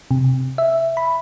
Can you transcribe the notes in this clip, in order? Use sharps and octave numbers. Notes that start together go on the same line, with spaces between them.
C3
E5
B5